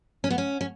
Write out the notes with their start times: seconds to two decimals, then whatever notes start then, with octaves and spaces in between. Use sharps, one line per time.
0.24 C#4
0.30 B3
0.38 C#4
0.61 C#4